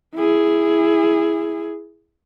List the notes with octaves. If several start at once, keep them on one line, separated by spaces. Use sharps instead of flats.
E4 G#4